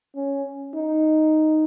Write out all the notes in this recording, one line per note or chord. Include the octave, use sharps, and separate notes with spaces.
C#4
D#4